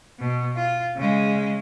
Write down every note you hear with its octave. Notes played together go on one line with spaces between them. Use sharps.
B2
F4
C#3 G#3